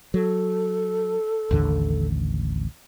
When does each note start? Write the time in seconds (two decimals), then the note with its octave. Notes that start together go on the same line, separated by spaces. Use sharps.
0.14 F#3 A4
1.51 A1 D#2 D3